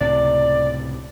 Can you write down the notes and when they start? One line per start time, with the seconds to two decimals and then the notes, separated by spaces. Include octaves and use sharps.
0.01 C#2 A2 C3 D5